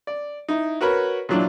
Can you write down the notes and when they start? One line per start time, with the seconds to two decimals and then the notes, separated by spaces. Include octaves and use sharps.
0.07 D5
0.49 D#4 E4
0.81 F#4 A#4 B4 C#5
1.29 A#2 E3 F#3 D4